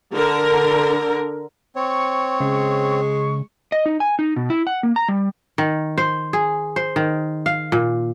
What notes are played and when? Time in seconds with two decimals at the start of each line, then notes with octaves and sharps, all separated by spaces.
0.12 D3 A#4
1.76 C4 C#5 C#6
2.40 C#3 G#3
3.72 D#5
3.86 D#4
4.00 G#5
4.19 D#4
4.36 B2
4.50 E4
4.67 F#5
4.83 A#3
4.96 A#5
5.08 G3
5.58 D#3
5.98 C5
6.33 G#4
6.76 C5
6.96 D#3
7.46 F5
7.72 A#2